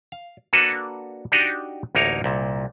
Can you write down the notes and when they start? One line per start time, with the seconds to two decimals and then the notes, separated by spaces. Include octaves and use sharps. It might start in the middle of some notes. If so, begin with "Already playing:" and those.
0.12 F5
0.53 A#3 D4 F#4 A4 B4
1.32 D4 D#4 F#4 G4 D5 D#5
1.95 A1 D2 A#3 D#4 A#4 C#5
2.24 C2 A#2